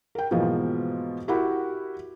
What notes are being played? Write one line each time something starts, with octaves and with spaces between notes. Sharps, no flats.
A#4 G5
G#2 B2 E3 F3 A#3
E4 F#4 G4 A#4 F#5 B5